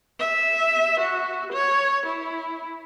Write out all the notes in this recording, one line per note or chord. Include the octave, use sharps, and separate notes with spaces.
E5
F#4
C#5
E4